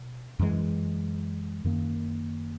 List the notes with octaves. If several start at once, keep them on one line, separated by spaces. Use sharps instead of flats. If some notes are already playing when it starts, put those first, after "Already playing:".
Already playing: B2
F#2 E3 G#3
F#2 D#3 A#3